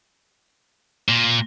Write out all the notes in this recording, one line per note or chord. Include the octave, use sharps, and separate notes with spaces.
A#2